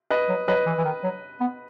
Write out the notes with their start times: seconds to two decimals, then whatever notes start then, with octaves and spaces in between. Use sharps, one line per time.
0.10 B4 D#5
0.29 F#3
0.48 F#3 B4 D#5
0.66 E3
0.78 E3
0.84 D#3
1.04 F#3
1.40 B3